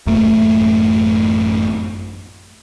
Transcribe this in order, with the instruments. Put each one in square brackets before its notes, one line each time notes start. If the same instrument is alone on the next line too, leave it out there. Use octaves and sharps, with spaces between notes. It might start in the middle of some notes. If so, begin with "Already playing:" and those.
[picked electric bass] A1 F#2 A3 A#3